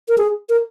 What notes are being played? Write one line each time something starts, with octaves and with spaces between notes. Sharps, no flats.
A#4
G#4
A#4